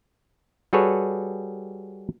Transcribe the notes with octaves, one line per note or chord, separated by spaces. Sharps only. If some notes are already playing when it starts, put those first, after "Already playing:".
G3 F#4 G#4 A4 B4 C#5